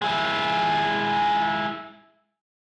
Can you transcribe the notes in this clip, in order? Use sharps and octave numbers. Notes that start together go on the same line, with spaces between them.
G#3 E4